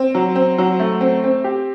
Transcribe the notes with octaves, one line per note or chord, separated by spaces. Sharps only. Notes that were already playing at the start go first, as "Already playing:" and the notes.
Already playing: C4
F#3
C4
F#3
A3
C4
C4
G4